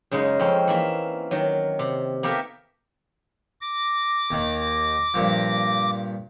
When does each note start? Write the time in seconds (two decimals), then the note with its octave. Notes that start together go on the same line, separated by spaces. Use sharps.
0.11 F#2 C#3 G#3 D#4
0.39 F2 C4 C#4
0.68 E3 A#3 E5
1.31 D#3 F#3
1.79 C3
2.23 A#3 B3 G4 A4 A#4 E5
3.61 D6 A#6
4.31 D#2 D#3
5.14 G2 A#2 F3